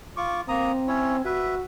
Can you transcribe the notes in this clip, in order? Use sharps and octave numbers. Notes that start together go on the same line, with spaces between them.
F4 C#6 D6
A#3 C4 A#5 D#6
C#4 E4 C#5
F#4 B4 E5